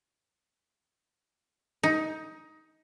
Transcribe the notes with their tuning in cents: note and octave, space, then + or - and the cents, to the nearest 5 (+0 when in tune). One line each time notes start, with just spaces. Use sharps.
D#4 +15